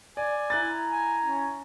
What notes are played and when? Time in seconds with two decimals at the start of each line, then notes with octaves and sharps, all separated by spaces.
0.17 D5 G#5
0.50 E4 A#5 F#6 A6
0.91 G#5
1.24 C#4